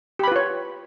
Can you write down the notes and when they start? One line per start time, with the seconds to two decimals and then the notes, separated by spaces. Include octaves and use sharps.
0.19 G4
0.23 B5
0.28 B4
0.32 F4
0.36 C#5